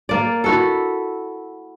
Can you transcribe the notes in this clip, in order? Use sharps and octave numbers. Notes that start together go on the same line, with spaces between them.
A#3 D5
E4 F#4 A4